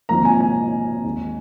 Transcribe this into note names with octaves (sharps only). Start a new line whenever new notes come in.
G#1 G#2 F3 A#3 A#5
G#5
G#5
D#2 D#3 G#3